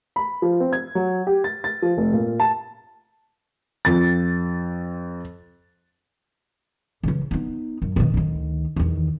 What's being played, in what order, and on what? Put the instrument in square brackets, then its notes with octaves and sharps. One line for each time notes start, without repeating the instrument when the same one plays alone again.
[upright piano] B5
F3
C4
G#6
F#3
G4
A6
A6
F3
F1
A#2
A5
F2 A6
[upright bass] C#3 E3
B3 D#4
F#2
B2 D#3
D2 D#3
E2 D#3